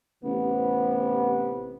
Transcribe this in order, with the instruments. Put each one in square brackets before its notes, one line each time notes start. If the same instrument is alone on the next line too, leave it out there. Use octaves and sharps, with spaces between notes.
[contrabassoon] A1 [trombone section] C3 B3